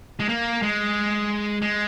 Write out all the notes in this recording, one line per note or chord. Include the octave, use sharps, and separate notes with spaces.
G#3
A#3
G#3
G#3